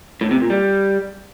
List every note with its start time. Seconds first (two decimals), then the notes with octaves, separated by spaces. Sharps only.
0.21 A2
0.31 C3
0.40 A#2
0.50 G3